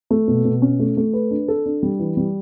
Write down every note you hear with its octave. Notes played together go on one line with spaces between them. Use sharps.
A3
B2
B2
C#4
A3
A3
B4
D4
A4
D4
G3
E3
G3